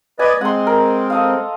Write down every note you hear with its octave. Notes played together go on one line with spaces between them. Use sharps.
B4 D5 D#5 G#5
G#3 C4 F#5 C6
A#4
A4 D#5 F5